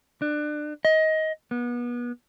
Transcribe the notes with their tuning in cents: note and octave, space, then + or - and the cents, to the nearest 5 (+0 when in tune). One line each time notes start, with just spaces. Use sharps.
D4 +25
D#5 +20
B3 -30